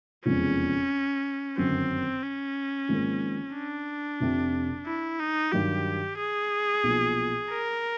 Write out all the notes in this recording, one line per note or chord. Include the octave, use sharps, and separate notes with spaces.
F1 E2 C#3 F3 G#3 C#4
G1 F#2 D#3 F#3 C4
C#4
G#1 G#2 F3 A#3
D4
F1 F2 C3
E4
D#4
G2 D#3 F#3 G4
G#4
B1 A#2 F3
A#4